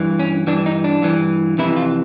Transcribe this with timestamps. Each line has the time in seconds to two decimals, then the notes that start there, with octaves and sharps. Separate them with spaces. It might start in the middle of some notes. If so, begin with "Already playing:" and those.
Already playing: G2 E3
0.19 C#4
0.47 G2 E3 D4
0.66 D#4
0.84 D4
1.02 G2 E3
1.58 F2 C3 E3 E4
1.77 F4